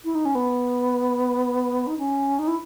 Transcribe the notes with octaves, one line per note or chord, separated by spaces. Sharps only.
E4
D#4
C#4
B3
D#4
C#4
D#4
E4